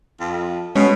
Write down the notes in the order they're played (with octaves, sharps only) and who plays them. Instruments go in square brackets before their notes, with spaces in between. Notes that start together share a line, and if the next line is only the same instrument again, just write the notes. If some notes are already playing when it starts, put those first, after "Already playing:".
[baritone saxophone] F2
[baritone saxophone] B2 [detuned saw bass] G#3 [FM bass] C#4